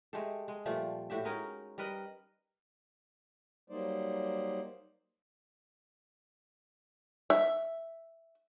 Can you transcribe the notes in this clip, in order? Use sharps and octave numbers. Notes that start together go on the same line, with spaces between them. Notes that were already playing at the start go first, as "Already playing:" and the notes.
G#3 A3 G4 A4
G#3
A#2 F3 G3 A3
A2 F#4 G4 E5
G#3 C#4 D#4 A#4
G3 A#4 B4 D#5
F#3 G3 A#3 D#4 C5 D5
E5